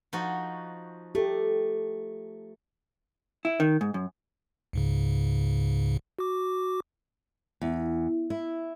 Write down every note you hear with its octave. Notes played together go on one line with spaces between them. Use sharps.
F3 D#4 F#4
A3 G4 A4
E4
D#3
G#2
F#2
C#2 G#2 C#3
F#4 D6
E2
E4